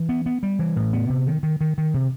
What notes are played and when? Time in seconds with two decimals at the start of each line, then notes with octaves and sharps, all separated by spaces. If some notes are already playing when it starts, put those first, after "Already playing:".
Already playing: E3
0.09 B3
0.26 B3
0.43 G3
0.59 E3
0.76 A2
0.93 B3
1.09 C3
1.26 D#3
1.43 D#3
1.61 D#3
1.78 D#3
1.94 C3